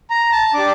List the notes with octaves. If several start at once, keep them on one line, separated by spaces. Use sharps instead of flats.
A#5
A5
D4 G4 D6